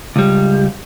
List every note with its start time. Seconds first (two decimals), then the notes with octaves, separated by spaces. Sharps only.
0.16 C#2 G3